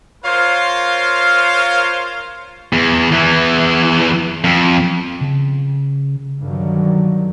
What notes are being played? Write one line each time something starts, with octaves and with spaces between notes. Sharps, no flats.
F4 A#4 C5 C#5 F5
E2
E2 E3
F2
C#3
G2 D3 D#3 F#3